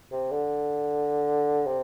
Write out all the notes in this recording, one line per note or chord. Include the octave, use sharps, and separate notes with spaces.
C3
D3
C3